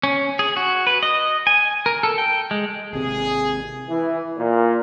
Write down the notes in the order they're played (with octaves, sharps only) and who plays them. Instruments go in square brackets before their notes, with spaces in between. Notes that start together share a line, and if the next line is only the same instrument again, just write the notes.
[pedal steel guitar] C#4
G#4
F#4
B4
D#5
G#5
A#4
A4
G5
G#3
[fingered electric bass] G#1 C3 [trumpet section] G#4
[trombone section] E3
A#2